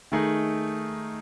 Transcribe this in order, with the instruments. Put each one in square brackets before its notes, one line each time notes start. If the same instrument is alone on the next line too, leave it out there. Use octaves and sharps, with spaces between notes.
[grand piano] D#3 A3 D#4 G#4